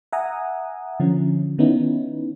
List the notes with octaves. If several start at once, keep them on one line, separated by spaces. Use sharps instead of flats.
E5 F#5 G#5 A#5 D#6
D3 F3 C#4
D#3 B3 C#4 D#4 E4